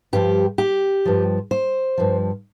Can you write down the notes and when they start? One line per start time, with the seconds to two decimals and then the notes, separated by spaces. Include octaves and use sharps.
0.13 G2 F3 G4
0.58 G4
1.05 G2 F3
1.51 C5
1.98 G2 F3